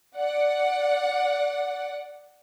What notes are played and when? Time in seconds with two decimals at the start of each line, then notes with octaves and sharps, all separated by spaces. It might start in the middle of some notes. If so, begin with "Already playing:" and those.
0.17 D5 F#5